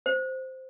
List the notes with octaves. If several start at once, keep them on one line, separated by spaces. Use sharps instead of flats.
C5